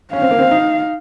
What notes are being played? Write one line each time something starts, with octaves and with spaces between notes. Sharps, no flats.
C#4 F5
C4
A#3
C4
D#4